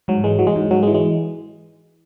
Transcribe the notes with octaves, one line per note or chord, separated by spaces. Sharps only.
G#2 F#3
E3 G#3
E3 F#3
G#3
G#2
G#2 F#3
G#3
E3
G#3